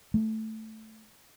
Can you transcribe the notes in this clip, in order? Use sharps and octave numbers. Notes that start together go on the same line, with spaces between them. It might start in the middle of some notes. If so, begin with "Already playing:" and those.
A3